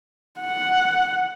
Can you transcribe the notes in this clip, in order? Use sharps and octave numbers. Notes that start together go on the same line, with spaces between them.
F#5